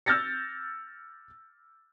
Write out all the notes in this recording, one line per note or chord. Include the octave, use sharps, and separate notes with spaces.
E6 F6 G6 A6 A#6 C#7